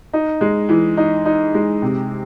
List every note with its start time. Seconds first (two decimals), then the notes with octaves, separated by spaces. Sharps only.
0.13 D#4
0.41 G#3
0.69 E3
0.97 D#4
1.26 D#4
1.54 G#3
1.82 C3